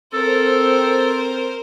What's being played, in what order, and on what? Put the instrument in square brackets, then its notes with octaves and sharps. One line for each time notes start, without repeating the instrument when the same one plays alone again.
[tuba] C4 [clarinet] A4 [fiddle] A#4 C5